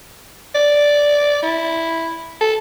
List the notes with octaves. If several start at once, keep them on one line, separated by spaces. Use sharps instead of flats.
D5
E4
A4